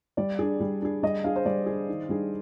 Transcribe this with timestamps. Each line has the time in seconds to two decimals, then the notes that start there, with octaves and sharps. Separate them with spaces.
0.17 G3 D5
0.39 D4 G#4
0.60 G3
0.82 D4 G#4
1.03 G3 D#5
1.24 D4 G#4 F5
1.36 C5
1.45 G3 D5
1.66 G#4
1.72 D4
1.89 D#3
2.09 G3 D4 G#4